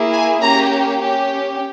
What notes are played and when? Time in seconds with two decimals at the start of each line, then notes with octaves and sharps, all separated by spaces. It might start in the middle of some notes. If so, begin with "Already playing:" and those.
Already playing: A#3 E4 G#4
0.12 G#5
0.42 A#3 C#4 G4 A#5
1.01 C#4 G4